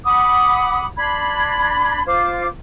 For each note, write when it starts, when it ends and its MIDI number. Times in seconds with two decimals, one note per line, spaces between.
0.04 0.85 78
0.04 0.85 83
0.04 0.85 86
0.04 0.85 87
0.96 2.01 62
0.96 2.01 83
0.96 2.01 84
0.96 2.01 92
2.06 2.46 65
2.06 2.46 72
2.06 2.46 86